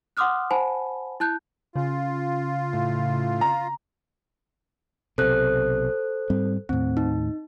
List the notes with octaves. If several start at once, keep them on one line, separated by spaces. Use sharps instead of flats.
F#5 C6 D6 D#6 F6 F#6
C5 F#5 G#5 A5 B5
E4 A5 F#6 G6
C#3 F4
A2
A#5
B1 C3 A4 C5 F#6
G#2 G3 C4
D#2 A2 C4
D#4